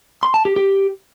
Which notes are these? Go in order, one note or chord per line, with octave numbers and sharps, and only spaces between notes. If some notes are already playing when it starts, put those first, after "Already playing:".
C6
A5
G4
G4